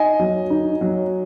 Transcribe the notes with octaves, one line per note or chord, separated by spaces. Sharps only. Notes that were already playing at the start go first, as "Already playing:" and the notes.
Already playing: D#4 D#5 G#5
F#3
D#4
F#3